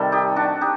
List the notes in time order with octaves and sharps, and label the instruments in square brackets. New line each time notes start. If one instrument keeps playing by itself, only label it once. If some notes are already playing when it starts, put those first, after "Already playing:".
Already playing: [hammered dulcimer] C3 D#3 G3 A4
D#4 G4
D4 F#4
D#4 G4